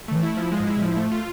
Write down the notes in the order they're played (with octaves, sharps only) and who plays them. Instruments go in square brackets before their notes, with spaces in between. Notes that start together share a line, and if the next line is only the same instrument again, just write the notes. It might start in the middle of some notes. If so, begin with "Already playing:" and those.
[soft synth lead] D3 [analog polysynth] A3
[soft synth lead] E3
[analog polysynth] E4
F3
G#3
[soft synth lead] G#2
[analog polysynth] E4
[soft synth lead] B2
[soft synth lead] A2 [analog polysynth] F3
[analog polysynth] A3
F4